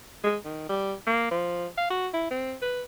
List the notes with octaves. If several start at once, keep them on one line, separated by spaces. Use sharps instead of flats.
G#3
D#3
G3
A#3
F3
F5
F#4
E4
C4
B4